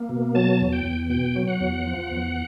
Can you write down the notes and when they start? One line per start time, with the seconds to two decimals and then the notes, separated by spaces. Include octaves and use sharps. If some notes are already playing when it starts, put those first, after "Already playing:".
Already playing: A#3
0.09 B2
0.35 F#3 A5
0.60 E2
0.73 G5
0.85 E2
1.10 B2 G5
1.36 F#3
1.48 F#5
1.60 E2
1.85 F3
2.11 E2